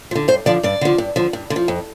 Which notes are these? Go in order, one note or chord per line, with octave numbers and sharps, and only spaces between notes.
F3
D3
G2 C5
D3 F3 D5
G2 D5
D3 F3
G2
D3 F3
G2
D3
F3
F2